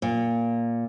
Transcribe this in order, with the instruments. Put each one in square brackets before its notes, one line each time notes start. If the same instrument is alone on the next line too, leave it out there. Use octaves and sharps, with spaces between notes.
[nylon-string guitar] A#2